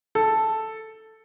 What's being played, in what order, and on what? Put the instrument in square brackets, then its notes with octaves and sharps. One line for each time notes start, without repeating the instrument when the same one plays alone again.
[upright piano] A4